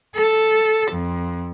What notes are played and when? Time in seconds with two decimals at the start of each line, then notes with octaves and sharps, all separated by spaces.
0.15 A4
0.92 F2